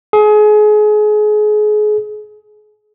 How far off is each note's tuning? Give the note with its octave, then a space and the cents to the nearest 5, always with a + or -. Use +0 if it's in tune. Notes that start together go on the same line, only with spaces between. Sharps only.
G#4 +30